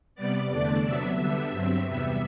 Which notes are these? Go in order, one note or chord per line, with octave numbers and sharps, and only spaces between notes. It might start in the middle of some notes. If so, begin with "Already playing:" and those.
C3 G3 B3 D5
E2 D3 A3 D4
C3 F#3 B3 D4 E5
D3 G3 B3 D4
G2 F#3 C4
E2 C3 G3 B3 E5